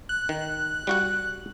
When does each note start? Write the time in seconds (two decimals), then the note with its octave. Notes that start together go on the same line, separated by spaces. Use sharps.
0.09 F#6
0.29 D#3
0.87 G3 F#4 F#5